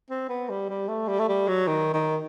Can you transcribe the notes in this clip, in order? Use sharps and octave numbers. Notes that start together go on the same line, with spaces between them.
C4
B3
G3
G3
A3
G3
A3
G3
F#3
D#3
D#3